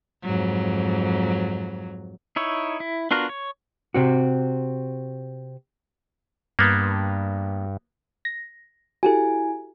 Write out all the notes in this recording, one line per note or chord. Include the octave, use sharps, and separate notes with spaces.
F2 G#2 F#3
D#4 E4 C#5
E4
B3 D4 F4 F#4 A#4
C#5
C3 C4 F#4
G2 A#3 B3
A#6
E4 F#4 G4 A4 G#5